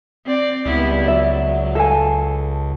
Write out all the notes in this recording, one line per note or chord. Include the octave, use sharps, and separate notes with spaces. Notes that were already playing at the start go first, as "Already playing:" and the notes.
C4 D5
C#2 G3 B3 E4
F#3 D5 E5
A4 F5 G#5